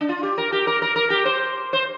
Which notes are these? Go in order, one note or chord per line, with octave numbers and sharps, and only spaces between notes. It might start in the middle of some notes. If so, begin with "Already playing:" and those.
D4
F4
G4
A#4
G4
A#4
A#4
A#4
G4
C5
C5